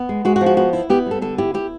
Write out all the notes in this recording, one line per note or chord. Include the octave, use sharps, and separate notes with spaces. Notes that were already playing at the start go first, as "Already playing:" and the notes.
Already playing: B3
G#3
G#3 F#4
F#4
F3
F#4
B3 F#4
E4
B3 G4
G3 A4
D3 A4
E4 G4
E4 G4